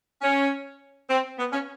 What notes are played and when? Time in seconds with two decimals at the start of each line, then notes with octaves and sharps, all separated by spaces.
0.22 C#4
1.09 C4
1.38 B3
1.52 C#4